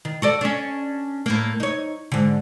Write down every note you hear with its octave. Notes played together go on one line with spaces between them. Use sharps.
D#3
F#4 A4 D5
C#4 D4
A2 A#3
D#4 C#5
G#2 D3